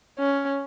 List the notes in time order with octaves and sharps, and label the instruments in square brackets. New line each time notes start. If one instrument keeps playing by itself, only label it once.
[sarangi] C#4